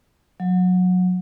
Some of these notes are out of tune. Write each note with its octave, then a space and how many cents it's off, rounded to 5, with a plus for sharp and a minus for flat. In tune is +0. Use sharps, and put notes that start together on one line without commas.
F#3 -25